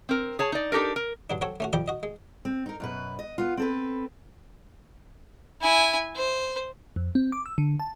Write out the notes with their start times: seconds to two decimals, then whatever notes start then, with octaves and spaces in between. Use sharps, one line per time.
0.09 C4 A#4
0.39 G#4 C#5 A5
0.52 D#4 D5
0.72 D4 D#4 G4 A4 A#4
0.96 A#4
1.30 G2 F#3 D4
1.41 F#3 C4 F#4 A4 C#5
1.60 A3 C#4 F#4
1.73 F2 F3 G3 D5 G5 D6
1.88 F#4 D#5
2.03 G#3
2.45 C4
2.66 D#4 A#4
2.80 F#2 B2 B4
3.19 D#5
3.38 B3 F4
3.57 C4 A4 B4
5.61 E4 G#5
6.16 C5
6.96 F2
7.15 C4
7.32 D6
7.46 E6
7.58 D3
7.80 A5